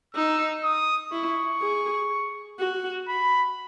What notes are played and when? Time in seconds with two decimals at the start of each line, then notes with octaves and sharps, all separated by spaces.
0.15 D#4 E6
0.64 D#6
1.12 E4 C#6
1.62 G#4
2.59 F#4
3.08 B5